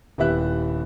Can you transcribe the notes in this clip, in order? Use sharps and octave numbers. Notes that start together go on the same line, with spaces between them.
D#1 B3 E4 G4 E5 F#6